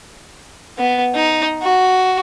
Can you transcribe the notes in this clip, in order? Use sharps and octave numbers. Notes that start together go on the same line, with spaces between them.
B3
D#4
F#4